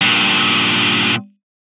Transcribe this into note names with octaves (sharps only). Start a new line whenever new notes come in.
G2 A#2